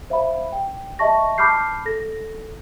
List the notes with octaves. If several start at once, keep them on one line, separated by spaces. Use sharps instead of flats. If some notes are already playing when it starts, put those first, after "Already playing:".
C5 E5 F5 B5
G5
D#5 E5 A5 C#6 A#6
A5 B5 D6 F6 G6 C7
A4 A#6